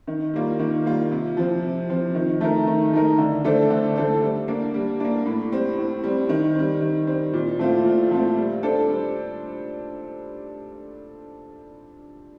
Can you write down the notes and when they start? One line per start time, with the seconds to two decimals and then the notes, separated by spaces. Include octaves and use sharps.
0.07 D#3
0.34 G3 A#3 F4
0.59 D#3
0.86 G3 A#3 F4
1.11 C3
1.37 F3 C4
1.63 C3
1.90 F3 C4
2.15 D#3
2.41 A3 D#4 A#4
2.67 D#3
2.93 A3 D#4 A#4
3.18 D3
3.44 A3 D4 A4 C5
3.70 D3
3.96 A3 D4 A4 C5
4.22 G3
4.48 A#3 D4
4.74 G3
5.00 A#3 D4
5.26 A2
5.52 G3 C4
5.77 A2
6.04 G3 C4
6.29 D#3
6.55 G3 C4
6.81 D#3
7.07 G3 C4
7.33 A#2
7.59 A3 C4 F4
7.85 A#2
8.11 A3 C4 F4
8.37 G3
8.63 D4 A4 C5
8.88 G3